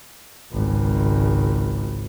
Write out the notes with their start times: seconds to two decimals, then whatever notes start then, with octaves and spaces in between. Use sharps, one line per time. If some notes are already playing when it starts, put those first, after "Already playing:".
0.52 G#1 C#2